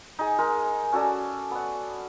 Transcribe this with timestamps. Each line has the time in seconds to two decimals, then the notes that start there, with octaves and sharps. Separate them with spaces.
0.19 D#4 G#4
0.38 G#3 A#4
0.92 C#4 F#4 A4 D5
1.51 B3 F#5